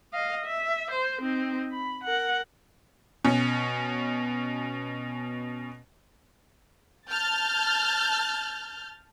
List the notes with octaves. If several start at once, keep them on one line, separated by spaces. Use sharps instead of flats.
D#5 F5
E5
C5
C4 D#4
B5
A#4 F#5
B2 C#4
A5 F6 G6 A6